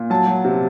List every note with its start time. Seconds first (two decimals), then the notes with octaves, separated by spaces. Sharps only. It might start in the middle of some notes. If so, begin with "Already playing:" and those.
Already playing: A#2
0.10 F#3 A5
0.27 F#3
0.44 C3